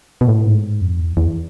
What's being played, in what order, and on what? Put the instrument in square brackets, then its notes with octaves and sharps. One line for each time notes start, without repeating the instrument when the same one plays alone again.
[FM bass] B2
A2
G#2
F2
E2
E2